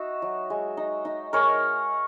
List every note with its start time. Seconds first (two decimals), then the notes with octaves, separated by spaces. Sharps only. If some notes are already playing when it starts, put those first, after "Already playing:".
Already playing: D#4 F#4 E5
0.22 F#3
0.50 G#3
0.77 D#4
1.05 D#4
1.33 G#3 A#4 C#5